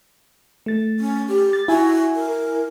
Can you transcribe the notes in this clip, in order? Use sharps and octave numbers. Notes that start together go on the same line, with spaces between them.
A3 A6
C#4
G4
A6
E4 F#4 E5 G#5
A#4